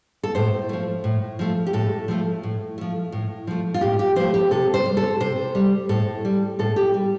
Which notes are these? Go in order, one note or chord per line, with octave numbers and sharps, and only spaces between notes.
A4
A2 C5
F3 A3
A2
F3 A3
G4
A2 A4
F3 A3
A2
F3 A3
A2
F3 A3
F4
A2 G4
G4
F3 A3 C5
G4
C3 A4
C5
G3
A4
C3 C5
G3
A2 A4
G3
A2 A4
G4
G3